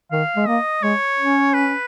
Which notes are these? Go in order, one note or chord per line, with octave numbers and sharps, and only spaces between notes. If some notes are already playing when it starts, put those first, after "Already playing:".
D#3 F5
G#3
A#3 D#5
G#3 C#5
C#4
B4